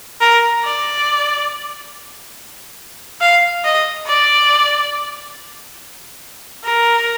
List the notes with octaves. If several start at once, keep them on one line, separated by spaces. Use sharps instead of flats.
A#4
D5
F5
D#5
D5
A#4